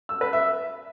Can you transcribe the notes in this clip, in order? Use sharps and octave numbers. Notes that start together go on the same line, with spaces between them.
E6
B4
E5